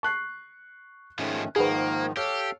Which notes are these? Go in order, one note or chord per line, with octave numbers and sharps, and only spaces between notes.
A5 C#6 F#6 C7
G#2 D#3 F3 G#3 A3 C#4
G#2 D#3 F3 A#3 G#4 B4 F#5
G4 A4 C#5 F5 F6